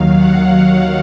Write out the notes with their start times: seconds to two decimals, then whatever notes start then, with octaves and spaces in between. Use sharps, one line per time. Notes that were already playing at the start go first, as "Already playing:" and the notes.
Already playing: D#2 D#3 F#3 F5
0.17 F#5